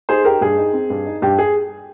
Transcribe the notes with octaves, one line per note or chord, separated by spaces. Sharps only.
D#4 G#4 C5
D#4 G4 A#4
G2 G#4
D#4
C4
G2
D#4
G2 G4
G#4